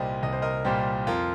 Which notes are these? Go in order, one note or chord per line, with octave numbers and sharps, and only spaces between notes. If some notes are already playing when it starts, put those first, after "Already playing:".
Already playing: C2 A#2 G3 G4 C5 D#5
C2 D#5
C5
A#4 D#5
A#2 G3 G4 C5
F2 F4 A#4